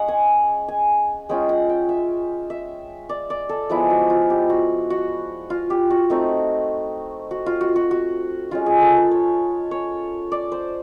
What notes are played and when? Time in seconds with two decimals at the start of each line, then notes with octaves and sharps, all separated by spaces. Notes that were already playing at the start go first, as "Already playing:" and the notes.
Already playing: G#3 C#4 D#5 F#5
0.08 G#5
0.68 G#5
1.29 G#3 C#4 F4 G5
1.49 F#5
1.69 G5
1.89 E5
2.50 E5
3.09 D5
3.30 D5
3.49 A4
3.70 F3 G#3 B3 E4
3.90 F#4
4.10 F4
4.30 G4
4.50 F#4
4.90 F#4
5.50 F4
5.70 G4
5.90 F#4
6.10 A3 C4 D#4
7.31 F#4
7.46 F4
7.61 F#4
7.76 F#4
7.91 F#4
8.51 G#3 C#4 F4
8.66 G#4
8.81 A4
8.97 B4
9.11 C#5
9.71 C#5
10.32 D5
10.52 C5